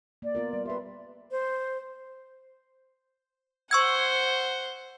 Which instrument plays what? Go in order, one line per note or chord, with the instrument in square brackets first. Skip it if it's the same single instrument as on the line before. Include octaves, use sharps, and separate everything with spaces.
[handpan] A#3 [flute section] D5
[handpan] B3 F4 A#4
G3
[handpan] G4 B4 [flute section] E5 C6
[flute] C5
[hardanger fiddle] C5 F#5 [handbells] C#6 E6 G#6